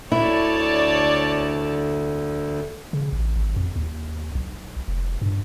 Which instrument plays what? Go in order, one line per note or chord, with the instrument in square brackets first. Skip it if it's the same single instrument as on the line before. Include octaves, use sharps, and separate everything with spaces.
[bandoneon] D2 D3 [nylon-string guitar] E4 [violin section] C#5 D5 A5
[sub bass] C#3
A1
G#1
F2
D#2
B1
F1
G2